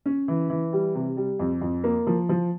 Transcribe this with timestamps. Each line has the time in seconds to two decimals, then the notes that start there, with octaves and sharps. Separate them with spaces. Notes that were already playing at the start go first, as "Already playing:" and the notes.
0.06 C#4
0.28 E3
0.50 E3
0.73 G3
0.95 C3
1.17 G3
1.39 F2
1.62 F2
1.84 A#3
2.07 F3
2.29 F3